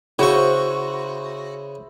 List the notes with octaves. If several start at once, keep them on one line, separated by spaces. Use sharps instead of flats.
C#3 E4 F#4 C5 C#6